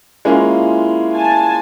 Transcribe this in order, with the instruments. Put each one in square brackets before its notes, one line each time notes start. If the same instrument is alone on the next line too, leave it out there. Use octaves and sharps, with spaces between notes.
[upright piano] G#3 A#3 C#4 [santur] E4 F4
[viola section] G#5 A5